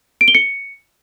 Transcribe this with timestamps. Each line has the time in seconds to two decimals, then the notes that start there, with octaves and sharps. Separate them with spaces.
0.21 D7
0.28 G7
0.35 C#7